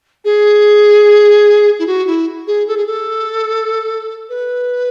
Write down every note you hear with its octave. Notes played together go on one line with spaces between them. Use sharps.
G#4
E4
F#4
E4
G#4
A4
G#4
A4
B4